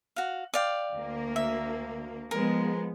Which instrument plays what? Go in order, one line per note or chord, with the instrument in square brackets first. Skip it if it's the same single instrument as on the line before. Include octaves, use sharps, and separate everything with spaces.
[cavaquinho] F#4 F5
D5 F5 G5
[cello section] D2 A#3
[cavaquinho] E5
[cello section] F3 G#3 B3 [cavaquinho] A#4